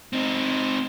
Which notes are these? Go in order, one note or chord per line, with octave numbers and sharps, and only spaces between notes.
C4 D#4